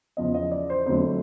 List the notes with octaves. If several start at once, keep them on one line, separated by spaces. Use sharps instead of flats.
E2 C#3 F3 D#5
D#5
D5
C5
F2 D3 F#3 A3 C5